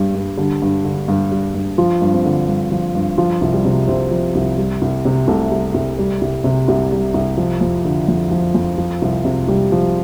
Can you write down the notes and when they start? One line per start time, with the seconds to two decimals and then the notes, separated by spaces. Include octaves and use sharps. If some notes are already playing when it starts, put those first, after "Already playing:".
Already playing: G2 G3
0.15 G2
0.37 D3 G3 D4
0.62 G2
0.84 D3
1.08 G2
1.32 G3
1.54 G2
1.78 F3 F4
2.02 G2
2.13 C4
2.25 D3
2.48 G2
2.72 F3
2.95 G2
3.18 F3 F4
3.41 C2
3.53 G3 G4
3.65 C3
3.87 C2 C4 C5
4.11 F3
4.35 C2
4.58 G3
4.82 C2
5.05 C3
5.28 C2 A3 A4
5.51 G3
5.74 C2
5.99 G3
6.21 C2
6.44 C3
6.68 C2 G3 G4
6.92 G3
7.14 C2
7.38 F3
7.61 F2
7.84 D3
8.08 F2
8.31 F3
8.55 F2
8.78 F3
9.02 C2
9.25 C3
9.48 C2 G3 G4
9.72 F3